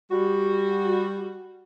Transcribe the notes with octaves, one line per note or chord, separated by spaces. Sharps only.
G3 F#4